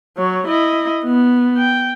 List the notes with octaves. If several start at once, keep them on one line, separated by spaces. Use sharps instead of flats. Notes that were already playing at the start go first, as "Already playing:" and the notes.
F#3 C#5
E4 D#5
B3
G5